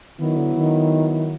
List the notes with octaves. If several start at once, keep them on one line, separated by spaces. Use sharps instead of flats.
D#3 F#3 B3 E4
D3
D#3